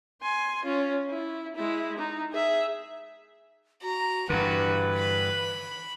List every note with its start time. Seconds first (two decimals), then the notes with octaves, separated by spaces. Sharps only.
0.21 G#5 C6
0.65 C#4 F4
1.09 E4
1.55 G#3 E4
1.98 D#4
2.33 G#4 E5
3.82 F#4 A#5
4.30 G2 D3 E3 F#4 B4
4.98 B5